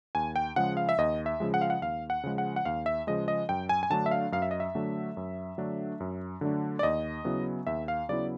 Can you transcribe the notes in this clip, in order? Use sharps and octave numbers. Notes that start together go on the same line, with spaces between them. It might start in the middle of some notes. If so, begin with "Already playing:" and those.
D#2 G#5
G5
C#3 F3 G#3 F#5
F5
E5
D#2 D#5
E5
C#3 F3 G#3
F#5
F5
F#5
D#2 F5
F#5
C#3 F3 G#3
F#5
F#5
D#2 F5
E5
C#3 F3 G#3 D#5
D#5
F#2 G5
G#5
G#5
D3 F#3 A3 D4 A5
E5
F5
F#2 F5
E5
D#5
E5
D3 F#3 A3 D4
F#2
D3 F#3 A3 D4
F#2
D3 F#3 A3 D4
D5
D#2 D#5
C#3 F#3 B3 E4
D#2 E5
F5
C#3 F#3 B3 E4 D5